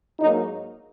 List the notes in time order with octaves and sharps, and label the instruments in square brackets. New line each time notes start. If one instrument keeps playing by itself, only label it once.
[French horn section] G#2 F#3 A#3 D#4